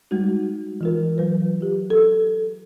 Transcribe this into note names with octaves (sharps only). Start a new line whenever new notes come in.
G3 G#3 D#4 F#4
E3 F4 A#4
E3 F#3 B4
F4 G4
A4